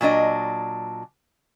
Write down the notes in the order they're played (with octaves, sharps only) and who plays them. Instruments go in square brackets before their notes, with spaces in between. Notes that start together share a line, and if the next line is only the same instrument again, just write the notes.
[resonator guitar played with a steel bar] A#2 F#3 D4 D#5